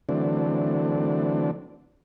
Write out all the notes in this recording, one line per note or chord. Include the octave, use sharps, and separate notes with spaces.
D3 E3 F#3 A3 C4 D4